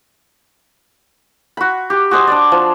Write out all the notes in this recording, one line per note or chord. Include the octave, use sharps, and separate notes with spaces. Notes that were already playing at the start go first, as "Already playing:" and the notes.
F#4 B5
G4
F#4 G#4 C5 D#5
D4 D5
F3